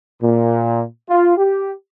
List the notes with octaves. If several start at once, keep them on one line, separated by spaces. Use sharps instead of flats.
A#2
F4
G4